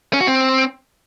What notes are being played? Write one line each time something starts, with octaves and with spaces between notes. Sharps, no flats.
C#4
F#4
C4